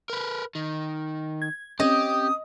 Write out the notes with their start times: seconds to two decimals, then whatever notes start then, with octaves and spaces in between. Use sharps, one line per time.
0.10 A#4 B4
0.55 D#3
1.42 G#6
1.80 C4 C#4 G4 D#5 D#6